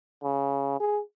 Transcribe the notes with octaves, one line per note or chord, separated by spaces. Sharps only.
C#3
G#4